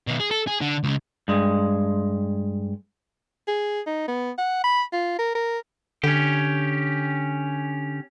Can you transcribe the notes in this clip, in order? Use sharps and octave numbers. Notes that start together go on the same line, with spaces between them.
B2 D#3
G#4
A4
G#4
D3
C#2 C#3
G2 G#3
G#4
D#4
B3
F#5
B5
F4
A#4
A#4
D3 C#4 G4